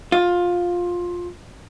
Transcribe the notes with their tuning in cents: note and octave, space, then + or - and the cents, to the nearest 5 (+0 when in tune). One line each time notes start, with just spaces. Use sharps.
F4 +15